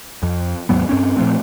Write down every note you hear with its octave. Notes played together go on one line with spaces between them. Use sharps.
F2
D#2 G#2 F#3 B3
G2 C4 C#4
A#2 F3 A3 C4